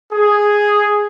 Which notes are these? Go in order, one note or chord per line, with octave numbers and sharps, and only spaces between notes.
G#4